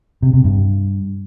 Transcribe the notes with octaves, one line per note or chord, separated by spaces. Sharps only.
C3
C3
G2